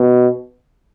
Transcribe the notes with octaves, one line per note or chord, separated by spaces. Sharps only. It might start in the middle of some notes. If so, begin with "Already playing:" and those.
Already playing: B2